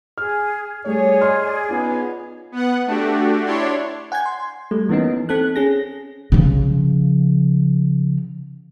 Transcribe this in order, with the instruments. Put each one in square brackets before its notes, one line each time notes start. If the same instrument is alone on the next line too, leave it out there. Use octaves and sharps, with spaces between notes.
[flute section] G#4 [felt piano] F6
[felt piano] G3 A3 [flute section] G#4 D5 [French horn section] C#5
[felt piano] D#5 C6 F6
[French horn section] B3 C#4 D#4 [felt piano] F4
[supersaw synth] B3 F#5
A3 D4 F#4 G4
D4 E4 C#5 D5 C6
[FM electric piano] F#5 G#5 G6 G#6
C6
G3 A3
E3 A#3 B3 C#4 D#4
C4 A4 F#6
C#4 G#4 A#6
[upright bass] C#3 F3